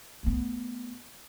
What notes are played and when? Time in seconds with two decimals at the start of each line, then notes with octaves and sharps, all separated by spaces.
0.23 A3 B3